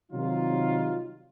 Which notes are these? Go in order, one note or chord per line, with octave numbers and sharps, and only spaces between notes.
C3 D#3 F#3 G3 D#4 F4